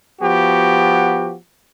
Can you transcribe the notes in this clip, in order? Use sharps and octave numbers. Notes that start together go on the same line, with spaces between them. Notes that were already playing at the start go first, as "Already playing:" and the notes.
F3 B3 F#4 G4